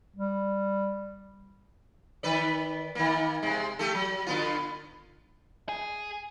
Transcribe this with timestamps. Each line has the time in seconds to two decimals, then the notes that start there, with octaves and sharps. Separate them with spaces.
0.16 G3
2.23 D#3 B4 D5
2.95 D#3 A#3
3.43 C3 G#3
3.79 A3 G4 A4
3.95 F#3
4.27 D3 B3 F4
5.69 G#4